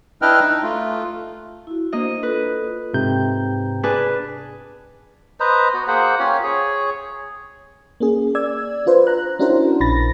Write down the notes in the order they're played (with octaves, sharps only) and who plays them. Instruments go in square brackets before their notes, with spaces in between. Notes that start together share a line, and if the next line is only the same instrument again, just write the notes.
[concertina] D4 E4 B4 D#5 G5 F6
D#4
A3 F4
[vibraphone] E4 F#4
[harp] A#3 D#5 [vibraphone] D4 C5
[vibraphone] F4 A4 [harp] B4
[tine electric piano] G#2 C3 G6 [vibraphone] G5 A#5
[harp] D4 G#4 B4
[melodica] B4 C5 D#5 A#5
B3 F#4
A#3 G#4 C5 F#5
C#4 F4 G4 C#5
G#4 C#5
[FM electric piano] A#3 C#4 G#4
D5 E6 G#6
D4 F4 B4 C5
A#5 F#6
C#4 D4 E4 F#4 A#4 C5
A#1 B5 A6 A#6